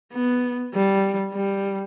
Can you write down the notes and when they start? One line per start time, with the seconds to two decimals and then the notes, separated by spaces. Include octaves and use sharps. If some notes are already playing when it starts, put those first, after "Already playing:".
0.13 B3
0.74 G3
1.34 G3